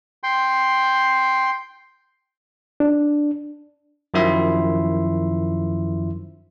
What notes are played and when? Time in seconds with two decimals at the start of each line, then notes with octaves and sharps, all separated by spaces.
0.23 G5 C6
2.80 D4
4.14 F#2 D#3 F3 E4 E5 C6